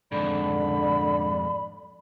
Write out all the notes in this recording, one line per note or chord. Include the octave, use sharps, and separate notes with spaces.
F2 G#2 D3 D5 B5